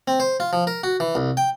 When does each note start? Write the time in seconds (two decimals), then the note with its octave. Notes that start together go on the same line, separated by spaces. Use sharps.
0.08 C4
0.20 C5
0.40 F4
0.53 F3
0.67 A#4
0.83 F#4
1.00 E3
1.15 C2
1.37 G5